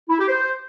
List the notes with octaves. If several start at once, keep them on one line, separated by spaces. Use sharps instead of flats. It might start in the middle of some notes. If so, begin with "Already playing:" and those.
E4
G4
C5